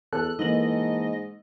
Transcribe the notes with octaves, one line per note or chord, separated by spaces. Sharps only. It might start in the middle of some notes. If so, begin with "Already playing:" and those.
E2 A4 F#6
G#2 E3 A#3 D#5 F#7